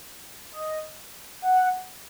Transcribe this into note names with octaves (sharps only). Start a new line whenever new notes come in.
D#5
F#5